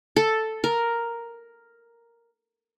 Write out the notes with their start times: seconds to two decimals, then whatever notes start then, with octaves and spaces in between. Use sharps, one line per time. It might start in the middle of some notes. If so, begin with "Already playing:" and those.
0.16 A4
0.64 A#4